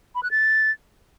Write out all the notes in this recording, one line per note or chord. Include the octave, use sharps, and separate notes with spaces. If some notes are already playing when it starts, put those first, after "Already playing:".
B5
F#6
A6